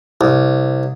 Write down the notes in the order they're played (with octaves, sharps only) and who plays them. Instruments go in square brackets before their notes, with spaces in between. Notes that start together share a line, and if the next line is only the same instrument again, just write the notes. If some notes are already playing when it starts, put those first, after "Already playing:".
[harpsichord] C2